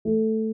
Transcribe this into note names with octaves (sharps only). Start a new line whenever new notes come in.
A3